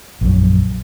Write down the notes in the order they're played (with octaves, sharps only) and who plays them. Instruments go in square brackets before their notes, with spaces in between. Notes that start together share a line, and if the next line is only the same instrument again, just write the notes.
[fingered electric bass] A#1 F#2